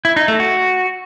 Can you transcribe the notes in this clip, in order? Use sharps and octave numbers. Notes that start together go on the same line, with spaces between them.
E4
D#4
A3
F#4